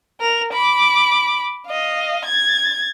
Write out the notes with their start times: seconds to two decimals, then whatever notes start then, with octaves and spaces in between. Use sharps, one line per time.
0.21 A#4 F7
0.53 B5 D6
1.67 D#5 F5
2.25 G#6 A6